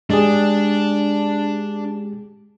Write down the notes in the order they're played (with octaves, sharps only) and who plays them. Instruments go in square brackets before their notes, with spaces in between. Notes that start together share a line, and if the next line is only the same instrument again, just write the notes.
[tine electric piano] G#3 G4 G#4 [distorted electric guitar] D4